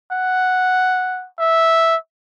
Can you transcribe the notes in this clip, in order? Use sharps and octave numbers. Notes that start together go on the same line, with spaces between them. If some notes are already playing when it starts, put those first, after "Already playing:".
F#5
E5